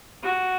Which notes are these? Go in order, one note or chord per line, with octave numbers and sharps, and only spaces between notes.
F#4